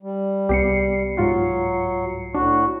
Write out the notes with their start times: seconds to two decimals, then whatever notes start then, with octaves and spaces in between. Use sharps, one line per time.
0.03 G3
0.49 C2 B3 G4 C7 C#7
1.17 G#2 F#3 F4 F#4
2.35 A2 D4 F#4